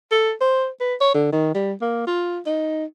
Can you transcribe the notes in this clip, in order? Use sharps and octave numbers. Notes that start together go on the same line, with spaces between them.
A4
C5
B4
C#5
D3
D#3
G3
A#3
F4
D#4